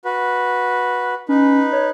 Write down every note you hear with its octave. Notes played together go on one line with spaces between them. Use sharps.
F#4 B4
C#4 D#4 B4
C#5